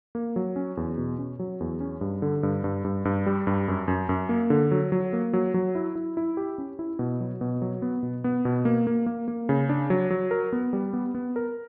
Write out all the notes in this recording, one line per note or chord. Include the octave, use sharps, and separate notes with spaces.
A#3
F#3
C#4
E2
B2
C#4
F#3
E2
C#4
G2
D3
G2
G2
G2
G2
G3
G2
F#2
F#2
F#2
A#3
D3
F#3
F#3
A#3
F#3
F#3
E4
E4
E4
G4
C#4
E4
B2
F#3
B2
F#3
B3
B2
B3
B2
A#3
A#3
A#3
A#3
C#3
D4
F#3
F#3
A#4
B3
G3
B3
B3
A#4